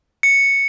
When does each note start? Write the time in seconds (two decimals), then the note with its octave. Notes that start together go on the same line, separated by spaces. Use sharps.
0.23 C#7